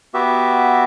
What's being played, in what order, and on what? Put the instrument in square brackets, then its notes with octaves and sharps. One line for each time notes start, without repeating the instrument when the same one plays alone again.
[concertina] B3 F#4 G4 E5